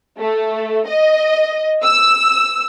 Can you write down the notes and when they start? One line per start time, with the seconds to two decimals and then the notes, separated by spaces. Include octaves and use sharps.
0.18 A3
0.87 D#5
1.83 E6